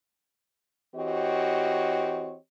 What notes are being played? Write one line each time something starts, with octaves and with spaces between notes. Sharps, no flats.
E3 C4 F#4 G4 C#5 D#5